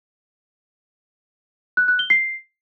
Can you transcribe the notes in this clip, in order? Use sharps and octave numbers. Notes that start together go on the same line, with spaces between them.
F#6
F#6
G7
C7